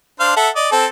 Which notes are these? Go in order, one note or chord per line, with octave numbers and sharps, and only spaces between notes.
D4 C5 F5
A4 E5 F#5
D5 D#5
C4 A4